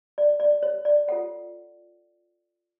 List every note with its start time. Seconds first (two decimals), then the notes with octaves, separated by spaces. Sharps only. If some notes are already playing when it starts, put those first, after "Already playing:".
0.18 D5
0.40 D5
0.63 C#5
0.85 D5
1.08 F4 A4 C#5 F#5